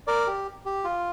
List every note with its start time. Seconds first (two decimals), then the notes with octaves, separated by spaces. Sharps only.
0.07 A#4 D5
0.27 G4
0.65 G4
0.84 F4